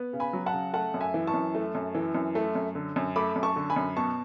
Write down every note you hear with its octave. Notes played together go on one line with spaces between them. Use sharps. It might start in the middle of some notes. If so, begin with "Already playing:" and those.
Already playing: B3
C#3
G#5 B5
F#3
F#5 A5
C#3
A3 F#5 A5
F#2
E5 G#5
E3
A5 C#6
F#2
A3
F#2
E3
F#2
A3
F#2
D3
F#2
A3 B5 D6
F#2
A5 C#6
D3
G#5 B5
F#2
B2 A5 C#6